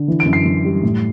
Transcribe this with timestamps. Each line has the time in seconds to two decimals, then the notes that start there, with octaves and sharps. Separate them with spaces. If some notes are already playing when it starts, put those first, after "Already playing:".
Already playing: D3
0.08 E3
0.20 D7
0.26 F#2
0.33 C7
0.45 F#2
0.65 G3
0.83 A2